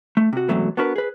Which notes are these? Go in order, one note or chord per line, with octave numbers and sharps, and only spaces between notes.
A3
C3 F#4
E2 G#2 C3 F#3 A3 B3
B3 D4 F#4 A#4 B4
G#4 B4